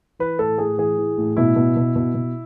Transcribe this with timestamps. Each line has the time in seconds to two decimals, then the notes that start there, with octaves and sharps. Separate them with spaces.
0.19 E3 B4
0.39 A2 A4
0.58 A2 G#4
0.78 E3 G#4
0.98 E3
1.18 A2
1.37 B2 E4
1.56 B2
1.76 B2
1.96 B2
2.14 B2